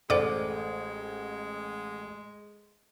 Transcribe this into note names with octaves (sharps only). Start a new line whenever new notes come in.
A1 G#3 A4 C5 D5 F#5 D6